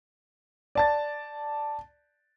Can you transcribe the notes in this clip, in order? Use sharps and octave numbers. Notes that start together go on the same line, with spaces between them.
D5 A5 A6